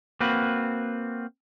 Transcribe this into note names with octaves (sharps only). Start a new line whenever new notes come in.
A#3 C4 F#4 B4